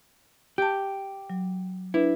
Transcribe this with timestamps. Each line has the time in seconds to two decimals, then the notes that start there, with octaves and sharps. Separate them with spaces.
0.58 G4 A5 G6
1.30 F#3
1.94 D4 E4 B4